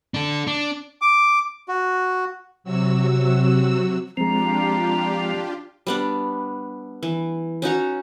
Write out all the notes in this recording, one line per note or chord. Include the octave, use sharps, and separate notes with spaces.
D4 A4
D4
D6
F#4
C3 F#3 F#4 E6
F3 G#3 C4 D4 F4 G4 A#5
G3 B3 D4
E3
C#4 D#4 F#4 C#5